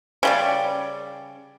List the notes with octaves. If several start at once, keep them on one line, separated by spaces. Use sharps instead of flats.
C#3 G3 D5